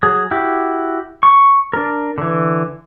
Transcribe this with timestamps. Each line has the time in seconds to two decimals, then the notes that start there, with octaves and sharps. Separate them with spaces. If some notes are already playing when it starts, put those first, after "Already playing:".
0.03 F#3 G#4
0.31 E4 F#4 G4
1.23 C#6
1.73 D4 A#4
2.18 D3 E3